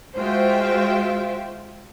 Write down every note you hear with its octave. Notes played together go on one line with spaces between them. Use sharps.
G#3 F4 F#4 C5 E5 G5